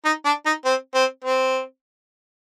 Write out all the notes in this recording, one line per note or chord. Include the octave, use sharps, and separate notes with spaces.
D#4
D4
D#4
C4
C4
C4